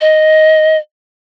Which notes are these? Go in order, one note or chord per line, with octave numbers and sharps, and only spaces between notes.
D#5